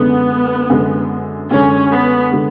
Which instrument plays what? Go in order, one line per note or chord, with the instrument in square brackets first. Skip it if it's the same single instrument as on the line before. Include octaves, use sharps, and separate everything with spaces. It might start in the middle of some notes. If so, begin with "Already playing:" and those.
Already playing: [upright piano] F#2 D3 G#3 [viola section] B3
[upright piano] F#2 D3 G#3
[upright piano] F#2 D3 G#3 [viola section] C#4
[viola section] B3
[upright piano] D3 G#3